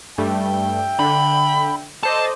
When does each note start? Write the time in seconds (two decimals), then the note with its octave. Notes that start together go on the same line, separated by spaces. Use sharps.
0.18 G2 G3 A3 E5 G5
0.99 D3 B5
2.03 D#4 A4 C5 D5 D#5 A5